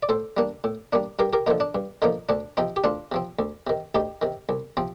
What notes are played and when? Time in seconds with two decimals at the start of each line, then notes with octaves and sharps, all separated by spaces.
0.03 D5
0.09 A2 A4 C5
0.37 G3 A#3 D4
0.64 A2
0.93 G3 A#3 D4
1.19 G2 G4 A#4
1.33 G4 A#4
1.47 D3 F3 A#3 D#4
1.60 D4
1.75 G2
2.02 D3 F3 A#3 D#4
2.29 D2 D4
2.57 C3 F3 C4 D#4
2.76 G4
2.84 D2 D4 F4
3.12 C3 F3 C4
3.39 D2
3.67 C3 D#3
3.95 D2 D#4 G4
4.22 C3 D#3
4.49 C2
4.77 C3 F3 C4